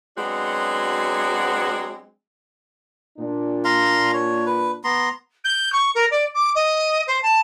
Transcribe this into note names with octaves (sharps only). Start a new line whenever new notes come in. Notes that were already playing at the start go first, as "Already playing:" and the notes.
F#3 G#3 B3 C4 D4 F#4
A#2 D4
F5 A#5 C6
C#5
B4
B3 A#5 C6
G6
C#6
A#4
D5
D6
D#5
C5
A5